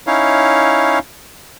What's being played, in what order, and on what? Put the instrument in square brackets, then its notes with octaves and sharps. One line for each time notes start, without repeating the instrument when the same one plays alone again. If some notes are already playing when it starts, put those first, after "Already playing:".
[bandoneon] C#4 D#4 E4 C#5 F5